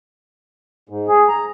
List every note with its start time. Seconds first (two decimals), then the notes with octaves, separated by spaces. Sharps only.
0.89 G#2
1.08 G#4
1.28 A#5